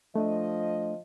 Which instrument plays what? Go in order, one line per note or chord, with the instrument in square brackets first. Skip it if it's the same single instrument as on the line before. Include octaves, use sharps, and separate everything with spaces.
[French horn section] F3 D#5 [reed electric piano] A3 D4